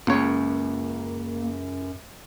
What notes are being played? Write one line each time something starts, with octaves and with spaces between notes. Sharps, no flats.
C#2 F#2 A#3 C#5